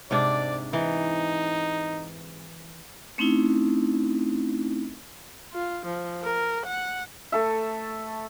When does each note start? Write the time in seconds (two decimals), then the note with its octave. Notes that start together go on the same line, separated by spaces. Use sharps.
0.11 G#2 C3 D4 D5
0.73 E3 D#4
3.18 A3 C4 C#4 D#4 E4
5.53 F4
5.86 F3
6.23 A#4
6.66 F#5
7.32 A3 A4 E5